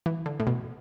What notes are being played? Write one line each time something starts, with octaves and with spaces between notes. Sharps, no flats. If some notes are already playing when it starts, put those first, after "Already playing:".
E3
D3
A2
B2